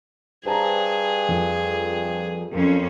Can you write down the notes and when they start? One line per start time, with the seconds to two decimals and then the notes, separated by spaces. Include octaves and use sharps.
0.45 G2 G#4 C5 A5 A#5
1.28 F2
2.52 F2 C#4 A#4